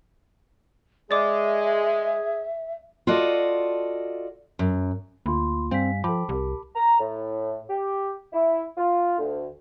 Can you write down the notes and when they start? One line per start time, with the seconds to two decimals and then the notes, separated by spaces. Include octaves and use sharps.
1.11 G#3 G#4 D5 E5 D6
3.07 F4 F#4 A4 D5 D#5
4.59 F#2
5.26 D2 A#3 F4 B5 C6
5.71 G2 G3 C4 F5 G#5 B6
6.04 F3 A4 C5 G5 A5 B5 D6
6.29 C2 G4 A#4
6.75 A#5
7.00 A2
7.70 G4
8.33 E4
8.77 F4
9.19 D2